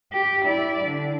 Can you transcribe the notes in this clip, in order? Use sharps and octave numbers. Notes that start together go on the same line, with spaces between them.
G4
E4 D5
D3